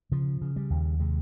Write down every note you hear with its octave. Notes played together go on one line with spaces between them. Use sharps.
C#3 F3
C#3
G3
D#2
C3 G#3